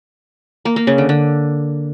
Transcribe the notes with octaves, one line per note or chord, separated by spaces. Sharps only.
A#3
A#3
C#3
D3
D3